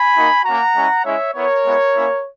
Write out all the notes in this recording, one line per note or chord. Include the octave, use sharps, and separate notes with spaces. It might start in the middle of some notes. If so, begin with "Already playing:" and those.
Already playing: G#5 B5
A#3 D#4 F#4
A#3 C#4 F#4 F#5 A#5
G#3 C#4 E4
G#3 C#4 E4 C#5 E5
B3 E4 A#4 C#5
G#3 B3 E4
A#3 C#4 E4